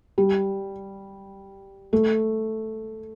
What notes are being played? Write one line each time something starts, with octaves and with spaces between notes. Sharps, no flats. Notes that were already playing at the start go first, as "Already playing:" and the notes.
G3
A3